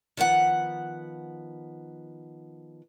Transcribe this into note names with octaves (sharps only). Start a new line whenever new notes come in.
D#3 F3 B3 F#5